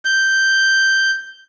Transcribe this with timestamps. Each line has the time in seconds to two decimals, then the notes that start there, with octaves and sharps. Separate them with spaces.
0.05 G6